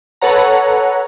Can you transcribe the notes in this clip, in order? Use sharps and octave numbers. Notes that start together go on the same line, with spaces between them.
A4 B4 C#5 F#5 A#5